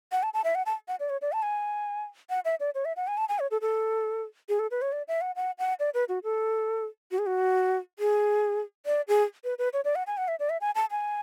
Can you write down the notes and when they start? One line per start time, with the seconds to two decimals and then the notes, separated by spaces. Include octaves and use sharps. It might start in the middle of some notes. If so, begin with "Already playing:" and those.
0.12 F#5
0.23 A5
0.34 A5
0.44 E5
0.55 F#5
0.66 A5
0.88 F#5
1.00 D5
1.10 C#5
1.22 D5
1.32 A5
1.43 G#5
2.30 F#5
2.45 E5
2.60 D5
2.75 C#5
2.85 E5
2.96 F#5
3.07 G#5
3.17 A5
3.29 G#5
3.39 C#5
3.51 A4
3.61 A4
4.49 G#4
4.59 A4
4.71 B4
4.82 C#5
4.92 D5
5.08 E5
5.21 F#5
5.36 F#5
5.59 F#5
5.80 D5
5.94 B4
6.09 F#4
6.24 A4
7.11 F#4
7.19 G#4
7.26 F#4
7.99 G#4
8.86 D5
9.08 G#4
9.44 B4
9.59 B4
9.73 C#5
9.85 D5
9.95 F#5
10.07 G#5
10.17 F#5
10.28 E5
10.39 D5
10.50 E5
10.61 G#5
10.75 A5
10.91 G#5